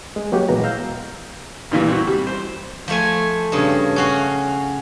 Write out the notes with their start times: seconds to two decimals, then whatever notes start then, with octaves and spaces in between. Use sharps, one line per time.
0.16 G#3
0.32 F#3 A#3 F#4 G4 F#5
0.48 A#2 E3 G#3 B3 A#5
0.64 F5 A#5 E6 G6
1.71 G2 A#2 E3
1.88 C4 F#4
2.07 G3
2.27 C5
2.88 F3 A3 G#5
3.52 G2 C#3
3.96 C#4 F#4 F5